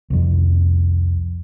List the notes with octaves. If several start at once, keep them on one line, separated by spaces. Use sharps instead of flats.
C2 F2